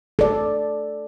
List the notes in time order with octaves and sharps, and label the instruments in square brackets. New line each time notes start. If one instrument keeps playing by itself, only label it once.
[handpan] A4 D5